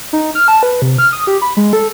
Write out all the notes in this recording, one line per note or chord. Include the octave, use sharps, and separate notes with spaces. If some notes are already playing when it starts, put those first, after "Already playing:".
D#4
F6
A5
B4
C3
F6
D#6
G4
B5
G#3
A4